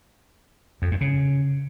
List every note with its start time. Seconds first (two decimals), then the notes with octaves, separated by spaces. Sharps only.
0.82 F2
0.91 G2
1.01 C#3